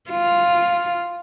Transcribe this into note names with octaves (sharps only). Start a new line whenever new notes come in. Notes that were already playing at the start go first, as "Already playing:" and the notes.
F4